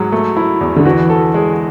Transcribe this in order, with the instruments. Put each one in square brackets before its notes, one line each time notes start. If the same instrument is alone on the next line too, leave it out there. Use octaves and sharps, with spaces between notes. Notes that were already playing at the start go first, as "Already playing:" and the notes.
Already playing: [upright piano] G#2 [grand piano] F#3
[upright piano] A3
E4
E2
[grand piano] D3
[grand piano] E3 [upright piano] F#4
[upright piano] A4
G#3